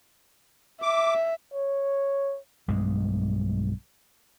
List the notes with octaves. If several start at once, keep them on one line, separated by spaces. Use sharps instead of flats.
E5 D6
C#5
B1 G2 G#3